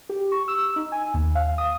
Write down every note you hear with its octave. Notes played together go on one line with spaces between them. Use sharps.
G4
C#6
E6
D#4
G#5
D#2
F5
D#6